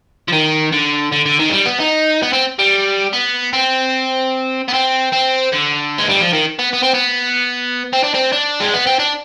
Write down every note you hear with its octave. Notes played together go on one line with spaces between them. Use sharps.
F3
D#3
D3
D3
D3
D#3
G#3
G3
B3
D#4
B3
C4
G3
B3
C4
B3
C4
C4
D3
G#3
G3
F3
D#3
B3
B3
C4
B3
C4
D4
C4
D4
G#3
B3
C4
D4